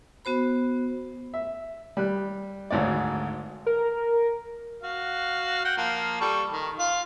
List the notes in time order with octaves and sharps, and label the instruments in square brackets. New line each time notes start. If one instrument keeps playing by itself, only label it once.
[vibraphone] B3 F#4 C5 B5
[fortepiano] E5
G3 F#6
G#1 D2 G#2 C#5 D5
[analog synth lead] A#4
[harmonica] F#4 F5
F#5 G5
F3 A#3
G3 A4 C#6
D#3
F4 F5